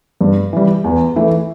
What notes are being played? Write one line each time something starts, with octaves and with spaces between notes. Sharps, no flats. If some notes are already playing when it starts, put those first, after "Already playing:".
G2
E3 G3
E2
E3 A3 E4